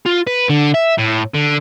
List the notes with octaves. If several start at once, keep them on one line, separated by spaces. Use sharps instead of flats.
F4
B4
D3
E5
A2
D3